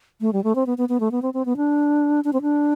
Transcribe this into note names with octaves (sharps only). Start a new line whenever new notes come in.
A3
G3
A3
C4
B3
B3
B3
A3
B3
C4
C4
B3
D4
D4
C4
D4